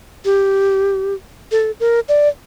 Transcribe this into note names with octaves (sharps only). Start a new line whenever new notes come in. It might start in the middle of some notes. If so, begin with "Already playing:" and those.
G4
A4
A#4
D5